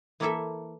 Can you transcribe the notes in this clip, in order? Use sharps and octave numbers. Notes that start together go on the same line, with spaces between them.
E3 A#3 E4 A4 E5